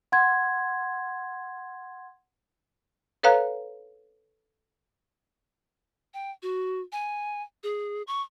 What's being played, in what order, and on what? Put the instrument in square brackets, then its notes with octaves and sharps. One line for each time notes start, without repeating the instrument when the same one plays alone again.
[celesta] F#5 C6 G#6
[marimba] A4 B4 C#5 F5 A#5 F#6
[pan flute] G5
F#4
G#5
G#4
C#6